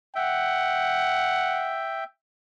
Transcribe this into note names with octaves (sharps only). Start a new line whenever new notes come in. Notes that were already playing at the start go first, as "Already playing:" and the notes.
E5 F#5 G5